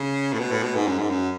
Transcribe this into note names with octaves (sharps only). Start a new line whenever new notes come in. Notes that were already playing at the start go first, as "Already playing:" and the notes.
Already playing: C#3
A2
B2
A2
B2
G#2
F#2
G#2
F#2